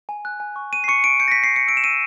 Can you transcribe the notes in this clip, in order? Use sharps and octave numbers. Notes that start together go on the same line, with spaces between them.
G#5
F#6
G#5
C#6
C#6 D#7
C7
C#6 C#7
G#5 D7
G6 C#7
A#6
G6 B6
C7
G6 C#7
E6 D7
E7
E6 D#7